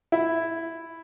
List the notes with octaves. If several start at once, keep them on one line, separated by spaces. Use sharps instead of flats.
E4